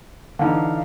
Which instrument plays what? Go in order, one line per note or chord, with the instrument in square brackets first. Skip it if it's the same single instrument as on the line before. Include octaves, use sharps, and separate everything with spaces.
[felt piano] D3 E3 D#4 [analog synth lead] F5